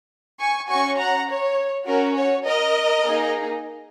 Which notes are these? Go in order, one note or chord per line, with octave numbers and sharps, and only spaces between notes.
G#5 C#6
C#4 F#4 G#5 C#6
F#5 A#5
C#5
C#4 F#4 A#4
C#5
A#4 D#5
A#3 D#4 G#4